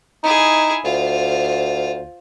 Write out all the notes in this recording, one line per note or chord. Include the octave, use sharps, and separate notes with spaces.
D#4 E4 G#4
D2 F4 C5